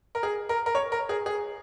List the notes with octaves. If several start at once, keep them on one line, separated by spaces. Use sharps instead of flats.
A#4
G#4
A#4
A#4
C#5
A#4
G#4
G#4